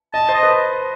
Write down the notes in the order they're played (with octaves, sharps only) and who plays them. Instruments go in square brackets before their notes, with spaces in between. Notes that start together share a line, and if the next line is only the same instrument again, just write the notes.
[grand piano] D#5 [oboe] A5
[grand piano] C5
[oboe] D#5
[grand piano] B4